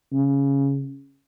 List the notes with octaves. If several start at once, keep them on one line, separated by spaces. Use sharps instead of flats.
C#3